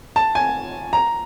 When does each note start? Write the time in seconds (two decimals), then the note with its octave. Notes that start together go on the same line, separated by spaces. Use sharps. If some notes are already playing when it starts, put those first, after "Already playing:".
0.16 A5
0.35 G#5
0.93 A#5